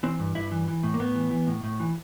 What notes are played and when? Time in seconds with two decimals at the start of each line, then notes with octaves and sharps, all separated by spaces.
0.03 E3 C4
0.19 G2
0.35 G2 E4
0.51 E3
0.68 E3
0.83 A2
0.94 A#3
0.99 A2 B3
1.15 E3
1.31 E3
1.47 A2
1.64 A2
1.80 E3